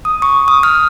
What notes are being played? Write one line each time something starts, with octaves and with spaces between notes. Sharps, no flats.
D#6
C#6
D#6
F6